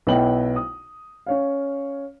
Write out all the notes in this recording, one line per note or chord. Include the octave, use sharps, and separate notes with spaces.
B1 B3 E4 G5 F#7
D#6
C#4 C#5 F5